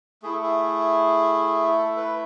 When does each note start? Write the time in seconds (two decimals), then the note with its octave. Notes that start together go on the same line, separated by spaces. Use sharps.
0.22 A3 E4 G#4
0.32 A4
0.43 G#4
1.78 A4
1.97 B4